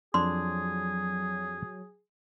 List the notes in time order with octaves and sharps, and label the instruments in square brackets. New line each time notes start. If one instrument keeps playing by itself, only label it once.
[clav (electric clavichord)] F2 D4 [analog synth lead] F#3 [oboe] G#4 [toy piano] C6